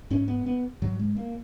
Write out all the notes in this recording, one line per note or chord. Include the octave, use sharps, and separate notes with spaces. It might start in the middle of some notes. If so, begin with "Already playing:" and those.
G#2 C#4
B3
B3
G#2 F#3
G#3
A#3